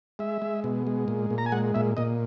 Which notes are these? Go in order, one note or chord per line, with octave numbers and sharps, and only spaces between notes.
G#3 E5
G#3
B2
G#3
A#2
A#2
A#5
G#5
G#3 F#5
A#2 E5
A#2 D#5